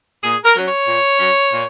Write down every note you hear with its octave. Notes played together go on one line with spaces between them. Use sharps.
A#2 G#4
A#4
F#3 C#4
C#5
A#2
F#3 C#4
A#2